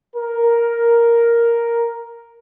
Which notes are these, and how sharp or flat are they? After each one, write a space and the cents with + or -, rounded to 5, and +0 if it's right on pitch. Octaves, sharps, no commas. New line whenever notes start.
A#4 +5